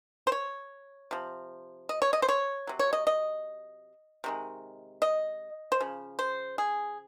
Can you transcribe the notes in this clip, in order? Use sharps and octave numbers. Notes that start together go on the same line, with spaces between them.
C5
C#5
C3 F3
D#5
C#5
D#5
C5
C#5
C3 F#3
C#5
D#5
D#5
C3 D#3 G#3
D#5
C5
C#3 F3
C5
G#4